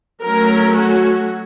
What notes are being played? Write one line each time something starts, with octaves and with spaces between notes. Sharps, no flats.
F#3 A3 C#4 A#4
F#4